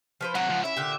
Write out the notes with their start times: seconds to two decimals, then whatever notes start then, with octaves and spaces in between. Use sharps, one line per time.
0.21 F3 B4 C5
0.35 C3 F#3 F#5
0.50 C#2 F3
0.64 C#4 E4 E5
0.77 A#2 D3 G4